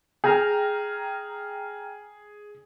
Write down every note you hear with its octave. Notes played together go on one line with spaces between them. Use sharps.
G#4 G5 A#5 F6